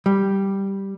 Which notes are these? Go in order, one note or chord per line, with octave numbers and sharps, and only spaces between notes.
G3